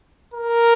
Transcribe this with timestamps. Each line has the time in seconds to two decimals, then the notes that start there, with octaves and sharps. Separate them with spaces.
0.34 A#4